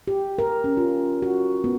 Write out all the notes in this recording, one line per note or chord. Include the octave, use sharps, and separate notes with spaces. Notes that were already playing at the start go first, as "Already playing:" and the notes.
G4
A#4
C#4
F4
F#4
B3